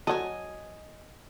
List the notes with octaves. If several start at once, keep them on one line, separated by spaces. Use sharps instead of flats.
F#3 A4 D#5 G#5